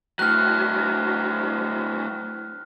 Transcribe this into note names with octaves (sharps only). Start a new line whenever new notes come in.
A2 F#3 F6 F#6